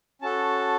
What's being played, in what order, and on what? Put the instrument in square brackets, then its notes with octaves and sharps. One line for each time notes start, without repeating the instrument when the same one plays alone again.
[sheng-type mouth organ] C#4 F#4 A4 A5